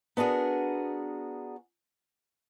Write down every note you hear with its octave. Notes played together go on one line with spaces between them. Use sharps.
B3 D4 F#4 G#4 A#4